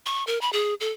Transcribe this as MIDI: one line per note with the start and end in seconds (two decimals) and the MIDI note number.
0.06 0.25 85
0.27 0.40 70
0.41 0.52 83
0.53 0.74 68
0.80 0.91 69